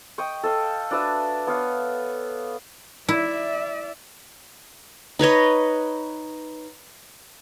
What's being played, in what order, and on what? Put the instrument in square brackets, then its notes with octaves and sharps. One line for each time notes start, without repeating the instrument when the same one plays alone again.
[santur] D#5 G5 C#6
A4 D#5 F5
D4 F#4 B4 E5
B3 C#5 F5
[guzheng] E4 [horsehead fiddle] D5 E5
[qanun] D#4 B4 C#5 D#5